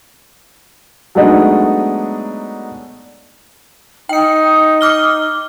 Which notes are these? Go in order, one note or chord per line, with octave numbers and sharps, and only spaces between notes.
F#3 G#3 A3 B3 D4 D#4
D#4 G5 C#7
D6 F6 G7